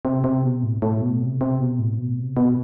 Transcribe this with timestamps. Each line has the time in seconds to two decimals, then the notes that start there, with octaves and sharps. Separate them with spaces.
0.05 C3
0.24 C3
0.43 B2
0.63 A2
0.82 A2
1.01 B2
1.21 C3
1.41 C3
1.60 B2
1.79 A2
1.98 B2
2.18 C3
2.37 B2